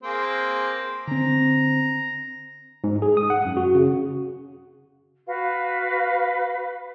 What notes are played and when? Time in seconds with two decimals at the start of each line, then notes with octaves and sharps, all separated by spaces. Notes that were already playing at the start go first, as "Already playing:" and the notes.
0.03 A#3 C4 G#4
1.07 D3 C4 A#5
2.84 G#2
3.02 G#4
3.17 D#6
3.30 F#5
3.45 F#2
3.57 F#4
3.75 C#3
5.27 F#4 B4 F5